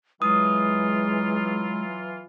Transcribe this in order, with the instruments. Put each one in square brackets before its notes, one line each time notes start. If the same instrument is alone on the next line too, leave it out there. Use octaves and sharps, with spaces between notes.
[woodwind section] E3 F#3 F4 [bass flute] G#3 [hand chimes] D#6